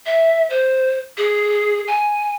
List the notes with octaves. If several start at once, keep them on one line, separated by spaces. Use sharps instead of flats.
E5
C5
G#4
G#5